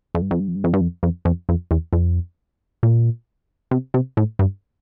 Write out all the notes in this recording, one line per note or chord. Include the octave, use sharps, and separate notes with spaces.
F2
G2
F2
G2
F2
G2
F2
G2
F2
F2
F2
F2
E2
F2
A#2
C3
C3
A2
G2